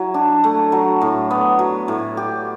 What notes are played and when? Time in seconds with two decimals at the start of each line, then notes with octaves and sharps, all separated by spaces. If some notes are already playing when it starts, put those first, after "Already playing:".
Already playing: F#3 E4
0.14 D4
0.44 A3
0.72 F#3
1.02 A2
1.31 B3
1.59 F#3
1.88 A2
2.17 G4